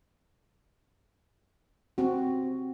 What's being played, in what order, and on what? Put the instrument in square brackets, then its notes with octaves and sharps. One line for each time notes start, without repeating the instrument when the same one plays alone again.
[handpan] C4 F#4